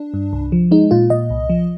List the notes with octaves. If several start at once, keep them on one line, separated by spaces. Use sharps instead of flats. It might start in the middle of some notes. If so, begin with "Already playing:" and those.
Already playing: D4
G2
C2
F3
G#3 D#4
A#2 F4
A#2 D#5
C2
F3